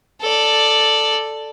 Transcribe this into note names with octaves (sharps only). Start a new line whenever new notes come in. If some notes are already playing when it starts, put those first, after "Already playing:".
A4 D5